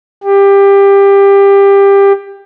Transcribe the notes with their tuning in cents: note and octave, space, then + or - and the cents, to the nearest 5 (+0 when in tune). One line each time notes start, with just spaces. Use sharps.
G4 +20